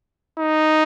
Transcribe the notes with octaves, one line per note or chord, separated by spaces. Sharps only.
D#4